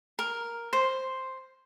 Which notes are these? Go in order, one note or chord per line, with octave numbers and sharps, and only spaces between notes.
A#4
C5